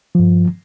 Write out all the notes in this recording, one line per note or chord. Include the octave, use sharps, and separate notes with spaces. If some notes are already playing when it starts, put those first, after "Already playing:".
G2 F3